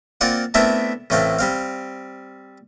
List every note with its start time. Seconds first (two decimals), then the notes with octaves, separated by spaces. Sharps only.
0.21 A#3 C4 F4 D5 F#5
0.54 A3 B3 C4 D4 E4 A#4
1.10 A1 A2 A3 C4 F5
1.39 G3 C4 F5